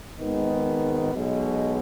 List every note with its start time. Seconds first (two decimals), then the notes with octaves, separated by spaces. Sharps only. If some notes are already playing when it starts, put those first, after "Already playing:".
0.18 G#1 G#2 D#3 G#3 B3
1.13 B1 B2 G#3